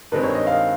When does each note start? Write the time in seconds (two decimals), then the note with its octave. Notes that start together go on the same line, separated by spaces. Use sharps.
0.12 G2 D#3 G#3 C4 B4
0.23 C#5
0.35 D#5
0.47 F5